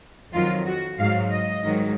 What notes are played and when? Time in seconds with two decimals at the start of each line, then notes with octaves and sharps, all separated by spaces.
0.33 F2 D#3 F#3 F4
0.66 F#4
0.98 G#2 F#3 F5
1.32 D#5
1.64 G#2 D#3 F#3